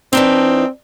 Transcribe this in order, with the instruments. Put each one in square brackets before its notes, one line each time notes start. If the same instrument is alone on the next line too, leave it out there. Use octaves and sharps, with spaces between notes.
[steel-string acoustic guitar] E3 D4 D#4 [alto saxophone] C4